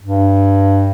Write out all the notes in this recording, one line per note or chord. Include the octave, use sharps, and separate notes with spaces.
G2